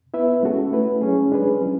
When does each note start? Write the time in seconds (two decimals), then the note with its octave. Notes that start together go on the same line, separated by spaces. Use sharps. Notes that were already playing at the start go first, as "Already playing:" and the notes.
0.14 B3 E4 B4 E5
0.43 G#3 C#4 F#4 A4
0.72 A3 E4 B4
1.01 F#3 C#4 G#4
1.32 G#3 D4 G#4 B4
1.61 F#3 C#4 E4